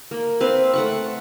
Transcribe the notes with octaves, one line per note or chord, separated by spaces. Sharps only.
A#3
C4 B4 F5
A3 F#5 C#6